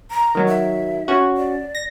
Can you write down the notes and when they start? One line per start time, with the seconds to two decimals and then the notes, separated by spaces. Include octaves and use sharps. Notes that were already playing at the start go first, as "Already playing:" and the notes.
0.11 A#5
0.35 D#3 F#3
0.48 E5
1.08 C#4 F#4
1.37 D5
1.75 A#6